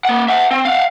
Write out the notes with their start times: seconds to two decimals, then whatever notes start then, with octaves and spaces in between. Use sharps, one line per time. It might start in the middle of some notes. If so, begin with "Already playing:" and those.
0.05 A#3 F#5
0.28 E5 F#5
0.51 C4
0.65 F5 F#5